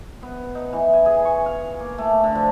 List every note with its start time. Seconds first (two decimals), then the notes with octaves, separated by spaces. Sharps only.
0.23 B3
0.55 D#4
0.73 E3
0.93 G#5
1.05 G#4
1.25 C#6
1.46 F5
1.80 A#3
1.98 A3
2.24 D3
2.35 F3